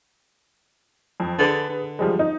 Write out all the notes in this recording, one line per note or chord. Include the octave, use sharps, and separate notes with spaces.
F2
D3 G#4 B4
D3
F3 G3 G#3
D#4